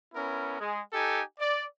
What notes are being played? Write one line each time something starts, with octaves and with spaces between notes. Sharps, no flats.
B3 C#4 E4 A#4
G#3 G#4
D#4 G4 A4 G#5
D5